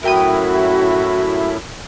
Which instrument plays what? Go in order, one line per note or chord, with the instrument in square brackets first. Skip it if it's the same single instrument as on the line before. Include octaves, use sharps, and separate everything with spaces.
[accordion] F#2 A2 E4 [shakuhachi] F#4 [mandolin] A#4 G5 D#6